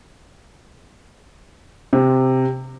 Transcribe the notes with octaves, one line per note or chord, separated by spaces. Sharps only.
C3